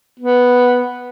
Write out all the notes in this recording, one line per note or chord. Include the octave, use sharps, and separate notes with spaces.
B3